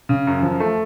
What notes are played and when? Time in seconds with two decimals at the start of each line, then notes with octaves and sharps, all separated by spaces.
0.09 C#3
0.27 F#2
0.42 F3
0.60 A3